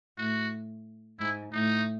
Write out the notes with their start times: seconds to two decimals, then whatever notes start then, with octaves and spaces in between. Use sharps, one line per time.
0.18 A2 F#4
1.19 G#2 E4
1.52 A2 D#4